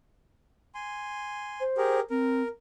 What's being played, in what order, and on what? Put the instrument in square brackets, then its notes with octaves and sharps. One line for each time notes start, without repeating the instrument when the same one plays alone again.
[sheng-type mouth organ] G#5 C6
[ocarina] C5
[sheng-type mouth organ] G4 G#4 A#4
[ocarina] C4 [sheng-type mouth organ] A#4